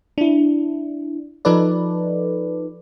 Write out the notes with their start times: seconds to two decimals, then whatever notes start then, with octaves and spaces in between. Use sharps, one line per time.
0.18 D4 E4
1.45 F3 D#4 A4 B4 D5